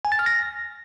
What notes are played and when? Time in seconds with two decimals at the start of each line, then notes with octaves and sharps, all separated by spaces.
0.05 G#5
0.12 A6
0.19 F6
0.26 A#6